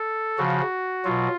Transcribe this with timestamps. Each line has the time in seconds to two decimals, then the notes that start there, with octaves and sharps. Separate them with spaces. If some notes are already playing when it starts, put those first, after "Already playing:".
Already playing: A4
0.38 C#3 F3 F#4
1.05 B2 F#3 F4